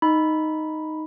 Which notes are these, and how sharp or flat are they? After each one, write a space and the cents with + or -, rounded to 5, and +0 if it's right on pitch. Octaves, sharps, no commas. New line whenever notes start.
D#4 +0 B5 +0